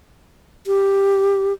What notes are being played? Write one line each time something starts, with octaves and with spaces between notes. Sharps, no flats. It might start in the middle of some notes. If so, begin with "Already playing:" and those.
G4